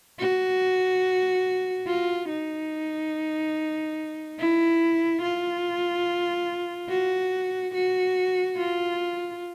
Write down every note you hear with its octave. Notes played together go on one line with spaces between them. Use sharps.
F#4
F4
D#4
E4
F4
F#4
F#4
F4